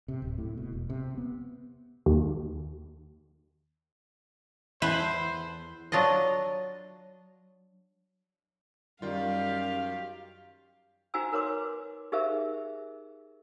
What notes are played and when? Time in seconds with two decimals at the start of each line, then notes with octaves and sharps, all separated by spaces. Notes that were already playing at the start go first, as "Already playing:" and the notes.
0.08 C3
0.22 D1
0.38 A2
0.57 B2
0.73 E1
0.90 C3
1.17 B3
2.06 D#2
4.82 E2 E4 A4 B4 C5
5.92 F#3 D4 F4 D#5
9.02 F#2 D#3 G3 F4 G4 F5
11.14 D#4 F#4 C5 G#5 A#5 E6
11.32 A#4 B4 C#5 C6 D6
12.12 D#4 G4 G#4 A#4 C5 E5